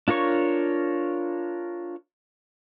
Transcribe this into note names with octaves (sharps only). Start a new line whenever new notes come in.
D4 F4 A#4 C#5 C#6